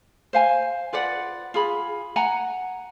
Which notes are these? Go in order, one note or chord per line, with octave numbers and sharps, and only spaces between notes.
C5 F5 G#5
F4 B4 D5 F#5
F4 G#4 B5
F#5 G#5 A#5